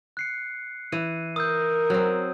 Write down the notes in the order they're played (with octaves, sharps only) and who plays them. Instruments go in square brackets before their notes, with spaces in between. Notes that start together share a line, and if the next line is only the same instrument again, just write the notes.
[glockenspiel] F#6 C7 C#7
[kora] E3 [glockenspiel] D#7
[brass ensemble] A#4 [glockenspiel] D#6 E6 G6
[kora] F#3 C4